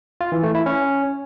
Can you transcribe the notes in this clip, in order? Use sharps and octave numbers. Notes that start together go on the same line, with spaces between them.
F4
E3
A3
E4
C#4